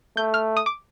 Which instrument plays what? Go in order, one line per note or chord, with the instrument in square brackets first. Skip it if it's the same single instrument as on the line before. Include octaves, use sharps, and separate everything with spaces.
[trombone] A3 [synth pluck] G6
[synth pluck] F6
D#6
D6